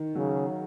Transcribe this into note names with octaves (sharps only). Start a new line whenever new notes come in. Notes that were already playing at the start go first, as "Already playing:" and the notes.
Already playing: D#3
C#3 F#3